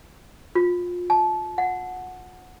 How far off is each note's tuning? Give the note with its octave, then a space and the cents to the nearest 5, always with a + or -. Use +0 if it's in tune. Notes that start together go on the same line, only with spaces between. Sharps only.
F4 +25
A5 -25
F#5 -10